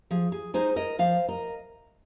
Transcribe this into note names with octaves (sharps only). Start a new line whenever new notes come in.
F3 G#4
G#4
G#3 D#4 G#4 C5
A#4 D#5
F3 C5 F5
A#4 D#5